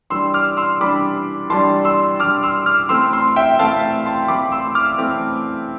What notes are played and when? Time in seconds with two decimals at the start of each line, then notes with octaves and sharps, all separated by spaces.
0.10 E3 G3 D4 C6 E6
0.34 D6 F6
0.57 C6 E6
0.80 E3 G3 D4 B5 D6
1.50 E3 G3 D4 A5 C6
1.85 C6 E6
2.19 E3 G3 D4 D6 F6
2.43 C6 E6
2.66 D6 F6
2.89 E3 A3 C4 C6 E6
3.13 C6 E6
3.36 E5 G5
3.59 E3 A3 C4 F5 A5
4.06 A5 C6
4.28 E3 A3 C4 B5 D6
4.52 C6 E6
4.75 D6 F6
4.98 E3 A3 C4